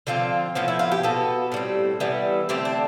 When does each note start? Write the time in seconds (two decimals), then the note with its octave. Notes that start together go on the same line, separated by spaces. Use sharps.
0.07 D3 F3 C4 F4
0.55 A2 F3 B3 F4
0.68 E4
0.79 F4
0.92 G4
1.03 B2 B3 A4
1.52 A2 G3 C4
2.00 E3 G3 B3
2.49 D3 A3 C4 G4
2.65 D4